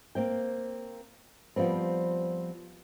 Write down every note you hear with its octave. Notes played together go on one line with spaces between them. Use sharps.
A#3 C4 G5
F3 G3 B3 C4